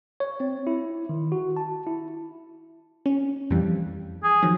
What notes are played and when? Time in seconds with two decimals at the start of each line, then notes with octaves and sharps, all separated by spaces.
0.20 C#5
0.40 C4
0.67 E4
1.09 D#3
1.32 F#4
1.57 A5
1.87 E4
3.06 C#4
3.50 F2 E3 G3
4.24 G#4
4.42 D#3 F3 F#3